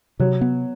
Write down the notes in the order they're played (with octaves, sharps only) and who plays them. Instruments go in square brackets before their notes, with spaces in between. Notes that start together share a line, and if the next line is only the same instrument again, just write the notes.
[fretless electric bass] C3 [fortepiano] F#3
[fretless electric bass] B3